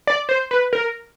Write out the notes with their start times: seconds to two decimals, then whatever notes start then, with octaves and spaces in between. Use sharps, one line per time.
0.07 D5
0.29 C5
0.51 B4
0.73 A#4